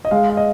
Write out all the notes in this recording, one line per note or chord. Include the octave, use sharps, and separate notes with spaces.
D#5
G#3 F5
F5
D#5